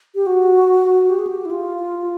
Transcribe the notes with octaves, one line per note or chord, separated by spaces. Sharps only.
G4
F#4
G4
G#4
G4
E4
F4